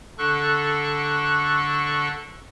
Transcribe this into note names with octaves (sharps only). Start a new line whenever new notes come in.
D3 D4 A4 C#6 F#6